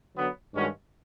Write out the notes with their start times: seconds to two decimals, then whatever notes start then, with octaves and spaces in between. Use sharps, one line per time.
0.14 D3 F#3 B3
0.52 G2 D#3 G#3 C#4 F#4